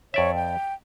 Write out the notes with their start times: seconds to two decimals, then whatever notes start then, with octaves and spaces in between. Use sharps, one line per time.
0.14 F2 C#5 D5 E5
0.35 G5